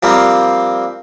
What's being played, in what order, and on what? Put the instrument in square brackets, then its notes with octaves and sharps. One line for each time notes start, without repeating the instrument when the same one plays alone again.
[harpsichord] F3 G3 A#3 C4